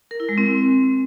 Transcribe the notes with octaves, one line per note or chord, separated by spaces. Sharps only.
A#4
E4
G#3
C4